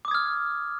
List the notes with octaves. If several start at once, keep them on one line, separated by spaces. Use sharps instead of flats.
D6 D#6 F6 G#6